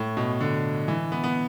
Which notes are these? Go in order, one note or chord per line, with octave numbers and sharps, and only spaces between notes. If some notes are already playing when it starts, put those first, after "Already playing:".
Already playing: A2
B2
D3
E3
B3
B3